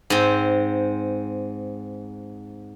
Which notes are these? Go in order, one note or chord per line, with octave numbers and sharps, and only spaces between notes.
G#2 C4